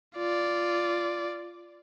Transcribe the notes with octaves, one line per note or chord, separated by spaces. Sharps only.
F4 D5